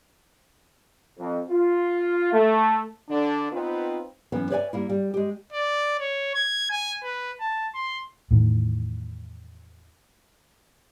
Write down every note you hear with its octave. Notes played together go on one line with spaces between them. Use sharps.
F2
F4
A3
D3 D4
B3 C4 D#4 F4 B4
F#2 E3 B3 C#4
B4 C#5 D5 E5 G5 G#5
G3 A#3 E4
G3
G#3 G4
D5
C#5
G#6
G#5
B4
A5
C6
E2 A2 D#3